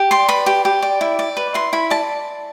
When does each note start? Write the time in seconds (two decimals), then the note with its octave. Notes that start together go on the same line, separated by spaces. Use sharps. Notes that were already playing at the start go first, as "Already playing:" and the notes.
Already playing: G4
0.11 D5 C6
0.29 B4 B5
0.46 G4
0.65 G4
0.82 D5
1.01 E4
1.19 D5
1.37 B4
1.54 E4 C6
1.73 E4 B5
1.90 D5 A5